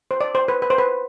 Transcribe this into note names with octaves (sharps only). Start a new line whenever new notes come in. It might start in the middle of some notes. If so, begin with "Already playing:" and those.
C5
D5
C5
B4
B4
C5
B4